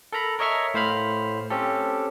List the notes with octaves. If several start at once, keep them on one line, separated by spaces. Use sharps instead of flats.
A4 A#4 A#5 B5
A#4 C#5 D#5 E5 C#6 F6
A2 C5 F5 B5 F6
C4 C#4 G4 A4